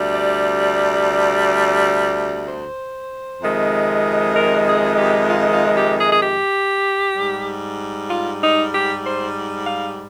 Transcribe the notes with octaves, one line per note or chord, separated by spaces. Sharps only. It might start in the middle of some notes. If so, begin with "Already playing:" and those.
Already playing: D2 C3 G3
D5
D5
C5
F2 C3 D#3 G#3
A#4
G#4
G4
F4
F4
G4
G#4
G#4
G4
G#2 G3
F4
D#4
G4
C5
F5